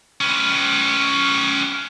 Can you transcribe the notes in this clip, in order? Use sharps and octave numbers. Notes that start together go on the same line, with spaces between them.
C#4 B4